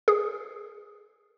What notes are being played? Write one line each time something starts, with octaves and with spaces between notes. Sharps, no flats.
G#4